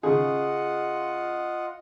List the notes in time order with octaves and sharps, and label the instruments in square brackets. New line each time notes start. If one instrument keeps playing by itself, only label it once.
[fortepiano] C#3 G#4 [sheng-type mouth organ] F4 D#5 F#5